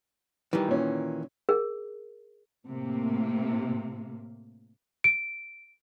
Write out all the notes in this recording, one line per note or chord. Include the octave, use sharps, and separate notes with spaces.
D#3 E3 G3
A#2 C#4
G#4 A#4
A2 C3 A#3
D7